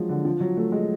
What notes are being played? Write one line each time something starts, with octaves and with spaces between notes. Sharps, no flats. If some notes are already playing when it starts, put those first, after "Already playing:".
Already playing: F3 F#3 G#3
D3
F3
F#3
A3
G#3